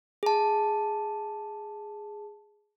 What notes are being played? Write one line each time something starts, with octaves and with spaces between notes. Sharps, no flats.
G#4 A5